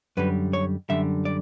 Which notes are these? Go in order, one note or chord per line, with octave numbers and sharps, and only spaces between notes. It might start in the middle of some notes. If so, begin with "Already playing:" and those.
F#2 D3 G3 B4
C#5
F#2 D3 G3 E5
D5